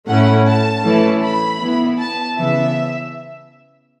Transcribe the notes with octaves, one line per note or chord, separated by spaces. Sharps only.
A2 A3 C#4 E4 F#5
A5
E3 A3 C#4 E4
B5
E3 B3 E4
A5
C#3 E3 B3 E5